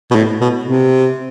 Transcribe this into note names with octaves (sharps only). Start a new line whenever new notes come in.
B2
A2
B2
C3